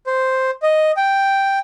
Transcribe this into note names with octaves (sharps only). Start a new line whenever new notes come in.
C5
D#5
G5